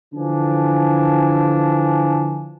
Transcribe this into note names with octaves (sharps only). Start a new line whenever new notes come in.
D3 E3 F3 D4 G#5